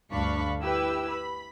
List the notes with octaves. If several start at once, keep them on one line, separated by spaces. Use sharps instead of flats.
D2 G2 D4 F5 B5 C#6
E4 G4 B4 G5 E6
B5